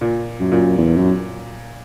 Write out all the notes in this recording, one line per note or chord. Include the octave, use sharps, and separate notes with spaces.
A#2
F#2
A#2
E2
F#2